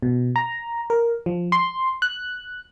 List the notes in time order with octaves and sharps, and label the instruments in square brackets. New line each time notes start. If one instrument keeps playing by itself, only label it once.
[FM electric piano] B2
A#5
A#4
F3
C6
F#6